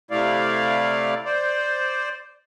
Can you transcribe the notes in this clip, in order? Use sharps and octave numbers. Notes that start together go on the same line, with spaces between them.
C3 A3 E4 D5 F5
C5 D5